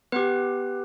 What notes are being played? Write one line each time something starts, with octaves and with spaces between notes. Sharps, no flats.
B3 G4 B4